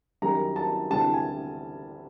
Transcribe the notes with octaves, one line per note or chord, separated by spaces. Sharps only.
F#2 D#3 G3 A#5
A5
D2 C3 E3 G3 A5
G#5